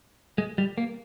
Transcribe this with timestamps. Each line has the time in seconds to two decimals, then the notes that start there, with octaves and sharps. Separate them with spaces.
0.38 G#3
0.58 G3
0.78 A#3